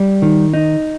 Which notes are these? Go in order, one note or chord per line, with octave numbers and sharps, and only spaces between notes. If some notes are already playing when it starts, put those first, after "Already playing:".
Already playing: G3
D#3
D#4